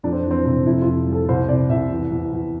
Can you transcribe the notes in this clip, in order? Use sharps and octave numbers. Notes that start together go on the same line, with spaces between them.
F2 D4
C4
E3
C4
C3
F2 E4
F4
F2
G3 A4
C2 C5
C3 D5
C2 E5
E2
E2
E2